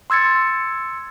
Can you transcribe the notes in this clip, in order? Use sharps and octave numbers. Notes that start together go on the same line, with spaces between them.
C6 E6 G#6 A6 C#7